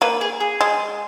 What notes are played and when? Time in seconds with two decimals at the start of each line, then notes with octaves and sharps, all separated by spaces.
0.01 A#3 B4
0.21 G#4
0.40 G#4
0.61 G#3